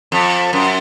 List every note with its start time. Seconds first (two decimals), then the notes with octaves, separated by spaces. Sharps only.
0.12 F2
0.53 F#2